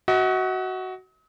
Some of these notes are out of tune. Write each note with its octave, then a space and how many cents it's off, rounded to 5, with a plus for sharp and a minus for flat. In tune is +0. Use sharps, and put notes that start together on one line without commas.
F#4 +10 D#5 +45